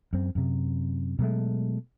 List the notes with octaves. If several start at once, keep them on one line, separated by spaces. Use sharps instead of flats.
F#2 C4
F#2 C3
B2 F#3 G#3 A3